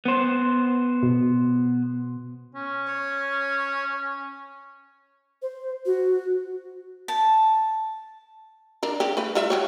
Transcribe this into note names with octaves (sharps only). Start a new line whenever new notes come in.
B3 C5
B2
C#4
C#5
C5
F#4
A5
D3 D4 A#4
C#3 G4
A3 B4
G3 F4 E5
F#3 G4 C#5